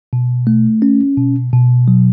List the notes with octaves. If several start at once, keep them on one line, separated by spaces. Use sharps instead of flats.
B2
A3
C#4
B2
B2
F#3